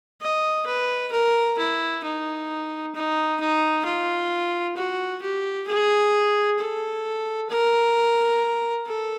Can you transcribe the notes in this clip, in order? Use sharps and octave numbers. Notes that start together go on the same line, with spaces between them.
D#5
B4
A#4
E4
D#4
D#4
D#4
F4
F#4
G4
G#4
A4
A#4
A4